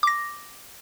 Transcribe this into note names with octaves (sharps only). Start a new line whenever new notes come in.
D6 A#6